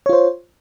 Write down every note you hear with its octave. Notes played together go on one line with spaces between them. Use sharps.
F4 C5 C#5